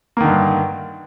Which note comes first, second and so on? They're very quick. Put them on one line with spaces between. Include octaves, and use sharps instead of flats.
A#3 D#3 D3 G2